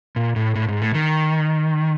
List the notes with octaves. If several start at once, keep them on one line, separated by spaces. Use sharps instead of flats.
A#2
A2
A2
G#2
A2
D#3